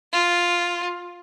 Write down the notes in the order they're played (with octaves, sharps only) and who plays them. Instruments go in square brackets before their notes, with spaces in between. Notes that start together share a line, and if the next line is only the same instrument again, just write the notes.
[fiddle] F4